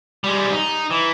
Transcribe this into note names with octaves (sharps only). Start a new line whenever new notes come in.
G3 G#3
D#4
E3